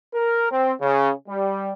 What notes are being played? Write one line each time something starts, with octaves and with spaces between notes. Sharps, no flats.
A#4
C4
C#3
G3